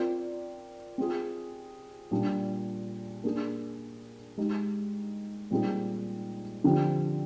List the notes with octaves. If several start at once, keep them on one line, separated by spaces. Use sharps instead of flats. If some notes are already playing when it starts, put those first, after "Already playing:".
Already playing: C4 F4 A#4 D5
C4 F4 G#4
A#2 G3 D4 F4
A#3 D4 G#4
G#3 D#4 G4
A#2 G3 C4 D#4 G#4
D3 F3 C4 G4